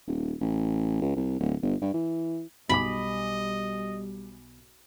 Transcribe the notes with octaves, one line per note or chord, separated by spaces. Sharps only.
D#1
A1
C#2
C2
D1
G1
G2
E3
B1 G3 D#5 G#5 B5 D6